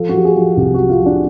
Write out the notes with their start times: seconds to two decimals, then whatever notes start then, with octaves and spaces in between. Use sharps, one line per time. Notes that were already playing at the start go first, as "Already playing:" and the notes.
Already playing: F3 A4
0.09 F#4
0.14 F3 G4
0.25 G#4
0.36 F3
0.57 C2 G4
0.74 F#4
0.79 F3
0.89 F4
1.00 F3
1.06 D4